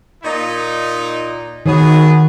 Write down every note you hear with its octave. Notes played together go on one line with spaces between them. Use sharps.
A#2 D#4
D#3 B3 F#4 G#4 C#5